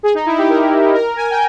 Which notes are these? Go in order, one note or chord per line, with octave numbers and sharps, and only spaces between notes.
G#4
D#4
E4
G4
A#4
A#4
G#5
G5